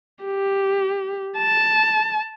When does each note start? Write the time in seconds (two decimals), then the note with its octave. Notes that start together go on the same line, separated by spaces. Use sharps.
0.24 G4
1.38 A5